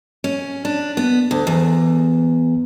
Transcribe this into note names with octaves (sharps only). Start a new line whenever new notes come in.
C#4
D4
B3
D2
E2